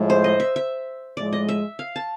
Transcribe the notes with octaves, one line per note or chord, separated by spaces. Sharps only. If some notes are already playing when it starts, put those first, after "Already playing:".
Already playing: A2 F3 G#3
C5
D#5
E5
E5
A2 F3 G#3 D5
D#5
E5
F5
A5